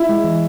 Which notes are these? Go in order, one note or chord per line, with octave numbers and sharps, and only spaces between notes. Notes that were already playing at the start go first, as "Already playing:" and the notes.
Already playing: E4
G#3
E3